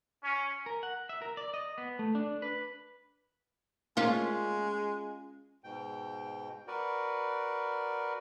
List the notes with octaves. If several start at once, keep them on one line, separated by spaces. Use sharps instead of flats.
C#4
A#4
F#5
E5
A#4
D5
D#5
B3
A3
D4
B4
G#3 A#3 C#4 F4
G#2 B2 G5
F#4 A#4 B4 D5